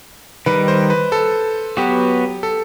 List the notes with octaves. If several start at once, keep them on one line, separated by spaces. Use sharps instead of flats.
D#3 G3 D#4 B4
C5
B4
A4
F#3 B3 F#4 G4 B4
A4